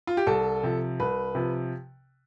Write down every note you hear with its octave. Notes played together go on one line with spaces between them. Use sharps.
F4
G4
C2 A4
C3 F3
C2 B4
C3 F3